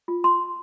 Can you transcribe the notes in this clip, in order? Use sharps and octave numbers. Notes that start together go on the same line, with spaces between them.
F4
C6